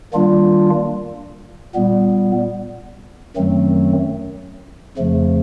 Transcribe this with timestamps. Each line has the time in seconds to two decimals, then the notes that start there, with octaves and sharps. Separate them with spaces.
0.13 D#3 G3 A#3 D4 F4
1.75 A#2 G3 B3
3.36 F#2 D#3 F#3 A3 C4
4.98 F2 C#3 F3 A3